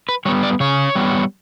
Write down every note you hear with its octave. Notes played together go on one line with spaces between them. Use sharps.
B4
G3 B3 C#5
D5
C#3 C#5
G3 B3